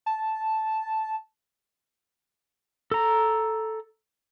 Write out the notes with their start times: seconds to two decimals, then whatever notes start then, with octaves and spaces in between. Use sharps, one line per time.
0.06 A5
2.91 A4 A#5